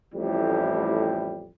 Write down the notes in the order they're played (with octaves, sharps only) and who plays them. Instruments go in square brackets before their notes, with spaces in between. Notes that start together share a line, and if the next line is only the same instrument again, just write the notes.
[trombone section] A1 F2 A2 G3 G4